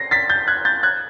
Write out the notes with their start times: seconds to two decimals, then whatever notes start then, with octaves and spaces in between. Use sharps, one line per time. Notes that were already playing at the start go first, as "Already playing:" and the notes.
Already playing: A#6 C7
0.11 A6 B6
0.29 G6 A6
0.47 F#6 G#6
0.65 G6 A6
0.83 F#6 G#6